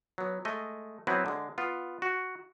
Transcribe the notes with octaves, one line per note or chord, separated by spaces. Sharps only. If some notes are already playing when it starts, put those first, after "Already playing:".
F#3 B3
G#3 A3 D#5
F#3 B3 C4 E4 B4
D3 G#3
B3 F4
F#4